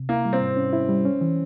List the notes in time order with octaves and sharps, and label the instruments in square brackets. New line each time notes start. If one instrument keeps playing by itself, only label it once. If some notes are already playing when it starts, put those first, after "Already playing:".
Already playing: [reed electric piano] C3
[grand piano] A#3 [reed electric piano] E4
[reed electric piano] G3
[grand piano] C4
[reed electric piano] G#2
C#4
E4
G3
C#4
E3